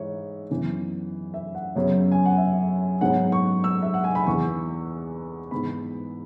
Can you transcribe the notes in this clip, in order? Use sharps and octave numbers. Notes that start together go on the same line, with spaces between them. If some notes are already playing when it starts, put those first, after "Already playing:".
Already playing: G#2 E3 C#5 E5
F#2 E3 B3
E5
F#5
F#2 C#3 F#3 B3 C#5
G#5
F#5
E5
G#2 F#3 B3 F#5
C#6
E6
E5
F#5
G#5
B5
E2 E3 B3 C#6
G#2 E3 B3 B5